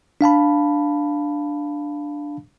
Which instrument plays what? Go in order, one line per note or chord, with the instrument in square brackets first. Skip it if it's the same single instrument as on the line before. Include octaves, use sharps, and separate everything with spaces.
[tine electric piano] D4 F5 A5 B5